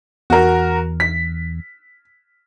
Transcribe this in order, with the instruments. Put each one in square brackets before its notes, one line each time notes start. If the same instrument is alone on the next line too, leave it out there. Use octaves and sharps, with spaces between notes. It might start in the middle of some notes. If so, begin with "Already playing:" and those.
[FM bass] E2 [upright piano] F#4 A#4
[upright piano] B6